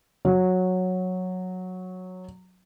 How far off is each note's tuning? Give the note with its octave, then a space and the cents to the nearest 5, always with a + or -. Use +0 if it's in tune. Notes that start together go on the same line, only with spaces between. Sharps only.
F#3 -10